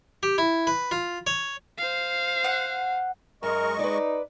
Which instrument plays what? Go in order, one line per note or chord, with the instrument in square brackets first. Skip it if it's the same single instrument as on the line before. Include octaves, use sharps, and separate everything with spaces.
[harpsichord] G4
E4
B4
F4
C#5
[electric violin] C5 F5
[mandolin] F#5
[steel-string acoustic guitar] F#2 [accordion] G#3 D#5 C#6 [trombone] A#4
[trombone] D#4 [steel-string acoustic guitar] B4 D5